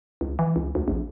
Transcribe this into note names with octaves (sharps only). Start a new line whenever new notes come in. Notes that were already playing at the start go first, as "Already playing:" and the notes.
C#2
E3
C#2
D2
A#1